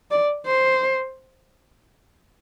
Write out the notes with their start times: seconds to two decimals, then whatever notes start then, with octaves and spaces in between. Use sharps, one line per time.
0.11 D5
0.46 C5